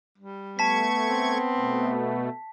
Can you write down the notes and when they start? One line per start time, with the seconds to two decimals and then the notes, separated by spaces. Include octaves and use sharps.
0.18 G3
0.59 A3 B3 A5 C#6 G#6 B6
1.08 C4
1.55 B2 A3